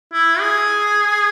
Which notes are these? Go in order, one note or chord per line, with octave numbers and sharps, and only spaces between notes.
E4
G#4